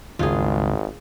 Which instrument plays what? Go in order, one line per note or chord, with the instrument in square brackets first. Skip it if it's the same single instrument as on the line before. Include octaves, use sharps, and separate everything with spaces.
[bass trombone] G#1 [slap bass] C#2 G2 D#3 [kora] F4 G#4